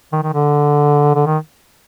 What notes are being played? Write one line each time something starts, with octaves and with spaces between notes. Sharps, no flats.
D#3
D#3
D3
D3
D#3